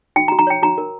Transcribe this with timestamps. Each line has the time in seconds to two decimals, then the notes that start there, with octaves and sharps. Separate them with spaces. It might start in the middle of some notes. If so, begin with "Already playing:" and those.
0.16 F#4 G5
0.28 A#5
0.32 F#4
0.39 A#5
0.47 C#5 G5
0.62 F#4 A#5
0.78 A#4